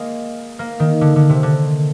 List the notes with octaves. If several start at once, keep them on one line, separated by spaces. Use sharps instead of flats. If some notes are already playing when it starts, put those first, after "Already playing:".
Already playing: G#3 A#3
A#3
D#3
D3
D3
C3
D3